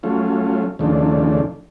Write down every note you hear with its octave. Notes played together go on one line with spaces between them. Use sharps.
F#3 A3 C#4 F4
D#2 C#3 F3 A3 D4